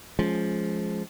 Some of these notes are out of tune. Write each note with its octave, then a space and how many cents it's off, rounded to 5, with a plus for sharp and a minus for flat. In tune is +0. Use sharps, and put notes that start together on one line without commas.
F3 +0 G#3 +15 C#4 +0